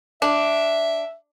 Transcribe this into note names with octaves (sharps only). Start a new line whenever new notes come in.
D4 E5